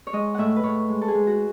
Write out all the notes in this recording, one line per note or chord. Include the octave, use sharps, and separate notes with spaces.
C#5
G#3 D#5
A2 E5 F#5
B4
A2 C#5
G#3
A4
G#4
G#3
F#4